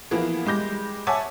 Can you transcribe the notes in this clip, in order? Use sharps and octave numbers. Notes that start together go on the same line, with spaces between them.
E3 F3 A#3 B3 G#4
G3 G#3 D6 G6 A#6
C#5 E5 F#5 G#5 A5 D6